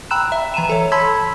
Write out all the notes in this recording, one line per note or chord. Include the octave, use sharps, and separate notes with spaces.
G5 A#5 B5 E6 F#6 E7
E5
E3 A#5 D#7 E7
A4 C#5
A5 B5 C6 E6 G#6 B6